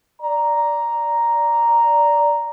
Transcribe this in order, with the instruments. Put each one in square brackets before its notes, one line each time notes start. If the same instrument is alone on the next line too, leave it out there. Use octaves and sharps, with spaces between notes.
[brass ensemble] D5 A#5